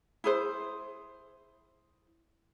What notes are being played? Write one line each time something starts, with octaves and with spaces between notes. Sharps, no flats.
E4 G#4 C5